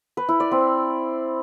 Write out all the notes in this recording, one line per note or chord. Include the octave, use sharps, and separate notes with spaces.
B4
E4
D5
C4